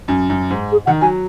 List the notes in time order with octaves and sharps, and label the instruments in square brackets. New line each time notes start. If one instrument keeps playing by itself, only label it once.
[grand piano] F#2
F#2
G#2
[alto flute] G#4
[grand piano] D#3 [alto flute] F#5
[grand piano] F#3 [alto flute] G#5